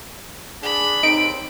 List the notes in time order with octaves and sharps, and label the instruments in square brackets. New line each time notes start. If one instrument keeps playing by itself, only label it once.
[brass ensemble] D4 G#4 [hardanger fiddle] B5
[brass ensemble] D#2 C4 [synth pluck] D#4 [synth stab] D7